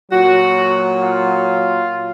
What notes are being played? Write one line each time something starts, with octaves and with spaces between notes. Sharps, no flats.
A#2 F#3 F#4
F4